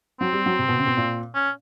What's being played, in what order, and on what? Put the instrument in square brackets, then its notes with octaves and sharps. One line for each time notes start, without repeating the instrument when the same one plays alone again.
[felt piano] F#3 [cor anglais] C4
[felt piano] G3
F#3
C3
B2
C#3
B2
A#2
[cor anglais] C#4